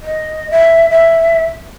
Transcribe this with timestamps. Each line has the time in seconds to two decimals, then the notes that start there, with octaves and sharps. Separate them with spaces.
0.01 D#5
0.50 E5
0.90 E5